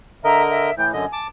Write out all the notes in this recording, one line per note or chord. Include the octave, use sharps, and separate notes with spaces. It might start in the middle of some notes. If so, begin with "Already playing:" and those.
D3 A#4 D#5 E5 A#5
E5
A2 E3 G5 G6
F#2 D3 D#5 G#5
A5 D6